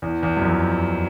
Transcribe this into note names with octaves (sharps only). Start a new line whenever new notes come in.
E2
E2
F#2
F2